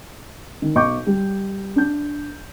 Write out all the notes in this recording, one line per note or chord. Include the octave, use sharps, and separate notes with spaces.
D#3
B1 D#5 C#6 D6 G6
G3
D4 G6